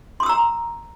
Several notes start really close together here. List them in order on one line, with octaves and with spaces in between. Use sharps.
C6 D#6 E6 A#5